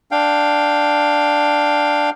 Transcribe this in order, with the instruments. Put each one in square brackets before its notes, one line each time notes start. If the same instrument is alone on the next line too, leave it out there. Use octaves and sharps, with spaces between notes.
[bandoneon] D4 F5 G5